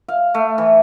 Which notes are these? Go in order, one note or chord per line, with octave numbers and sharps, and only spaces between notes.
F5
A3
E3